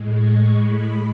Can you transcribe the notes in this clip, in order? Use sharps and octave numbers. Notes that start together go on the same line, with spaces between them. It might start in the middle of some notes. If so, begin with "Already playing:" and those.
Already playing: A2 G#3
C#6
B5